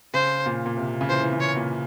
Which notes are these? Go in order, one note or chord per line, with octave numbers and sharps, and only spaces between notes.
C#3 C5
A#2
A#2
C3
C#3
E3 C5
E3
C#3
C#5
A#2